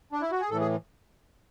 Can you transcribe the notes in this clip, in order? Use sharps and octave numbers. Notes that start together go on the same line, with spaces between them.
D4
E4
F#4
G#4
A2 E3 A4
G#4